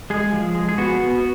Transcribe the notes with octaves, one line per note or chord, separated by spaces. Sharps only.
G#3 G#4
F3
G#3
G#4
B3 F#4
B3